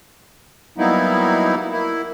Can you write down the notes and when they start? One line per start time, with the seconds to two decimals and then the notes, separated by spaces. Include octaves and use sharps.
0.78 F#3 G3 A#3 B3 D#4 E4
1.71 A#3 E4